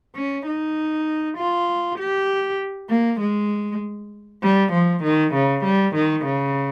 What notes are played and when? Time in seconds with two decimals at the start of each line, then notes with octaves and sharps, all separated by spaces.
0.16 C#4
0.46 D#4
1.38 F4
1.99 G4
2.90 A#3
3.21 G#3
4.43 G3
4.73 F3
5.04 D#3
5.34 C#3
5.65 G3
5.95 D#3
6.25 C#3